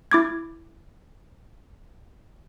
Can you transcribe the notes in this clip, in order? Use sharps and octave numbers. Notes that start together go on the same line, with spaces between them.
E4 D6 G#6